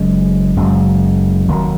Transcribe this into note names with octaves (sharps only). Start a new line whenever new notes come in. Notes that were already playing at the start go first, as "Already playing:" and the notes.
Already playing: F#1 F#2 C#3 G#3
F#1 F#2 C#3 G#3
F1 D#2 D#3 F#3